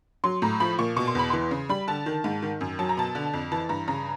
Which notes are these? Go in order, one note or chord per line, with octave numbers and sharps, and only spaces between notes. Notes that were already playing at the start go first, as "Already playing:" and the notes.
F#3 C6
A2 A#5
F3 B5
A#2 C#6
B2 C#6
C6
E2 B5
E3 C6
C#3
G3 B5
D3 A5
D#3
G#2
D#3
F#2
F#3 A5
A#5
B2 A5
D3
F2
E3 A5
G2 A#5
C#3 A#5